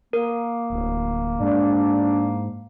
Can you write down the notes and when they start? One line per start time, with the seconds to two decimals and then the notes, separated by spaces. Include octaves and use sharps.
0.13 A#3 A#4
0.70 D1
1.40 G#2 D4